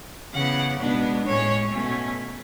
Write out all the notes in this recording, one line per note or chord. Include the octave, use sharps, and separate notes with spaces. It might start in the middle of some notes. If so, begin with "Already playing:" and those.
C#3 E3 B3 F#5
B2 G#3 B3 D4
A2 G#3 C#4 C#5
B2 A3 C#4